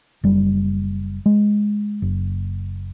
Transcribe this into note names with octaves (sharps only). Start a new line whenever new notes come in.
F#1 G3
G#3
F#1